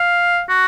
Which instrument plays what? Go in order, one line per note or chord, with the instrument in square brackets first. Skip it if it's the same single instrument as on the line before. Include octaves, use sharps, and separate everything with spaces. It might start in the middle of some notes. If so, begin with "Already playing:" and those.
Already playing: [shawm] F5
F#4